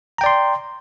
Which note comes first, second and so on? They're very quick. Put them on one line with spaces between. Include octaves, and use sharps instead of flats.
A#5 G5 D5 C6